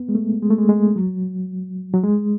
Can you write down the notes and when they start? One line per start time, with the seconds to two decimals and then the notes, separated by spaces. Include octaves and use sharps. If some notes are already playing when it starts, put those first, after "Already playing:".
Already playing: B3
0.09 G#3
0.15 A3
0.43 G#3
0.51 A3
0.59 G#3
0.69 G#3
0.96 F#3
1.94 F#3
2.04 G#3